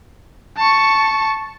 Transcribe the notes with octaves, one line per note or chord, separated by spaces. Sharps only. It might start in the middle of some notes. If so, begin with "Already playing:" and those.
A5 C#6